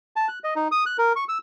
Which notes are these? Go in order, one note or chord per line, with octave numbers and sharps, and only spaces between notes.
A5
F#6
D#5
D#4
D#6
F#6
A#4
C#6
E6